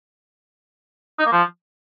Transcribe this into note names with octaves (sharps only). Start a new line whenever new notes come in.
D#4
A#3
F3